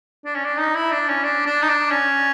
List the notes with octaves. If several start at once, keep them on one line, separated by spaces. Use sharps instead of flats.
D4
C#4
D4
D#4
E4
D4
C#4
D4
D4
D#4
D4
C#4